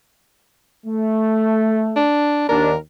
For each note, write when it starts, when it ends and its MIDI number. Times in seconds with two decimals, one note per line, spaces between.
0.86 2.06 57
1.96 2.47 62
2.49 2.74 39
2.49 2.74 62
2.49 2.76 70